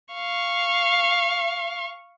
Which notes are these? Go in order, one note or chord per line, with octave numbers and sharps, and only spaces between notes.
F5 C#6